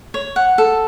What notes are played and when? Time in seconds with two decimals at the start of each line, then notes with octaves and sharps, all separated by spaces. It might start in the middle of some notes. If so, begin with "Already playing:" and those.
0.14 C#5
0.36 F#5
0.58 A4